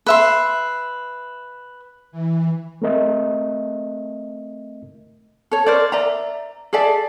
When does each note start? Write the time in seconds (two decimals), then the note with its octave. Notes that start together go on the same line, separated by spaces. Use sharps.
0.06 B4 E5 C6
2.12 E3
2.82 A3 C4 A#4 D#5 E5
5.51 A4 C#5
5.66 A#4 C5 D5
5.92 D5 E5 A#5
6.73 G#4 A4 D5 E5